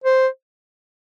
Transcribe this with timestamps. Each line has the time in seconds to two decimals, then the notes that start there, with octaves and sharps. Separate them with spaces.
0.04 C5